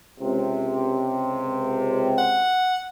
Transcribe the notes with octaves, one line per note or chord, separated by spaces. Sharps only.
C#2 C3
F#5